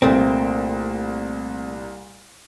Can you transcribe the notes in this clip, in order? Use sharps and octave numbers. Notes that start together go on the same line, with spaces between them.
C2 A#2 A3 C4